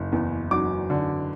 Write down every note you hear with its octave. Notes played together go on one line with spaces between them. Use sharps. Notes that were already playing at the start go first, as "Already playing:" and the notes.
Already playing: F#1
E2
F#3 D6
D3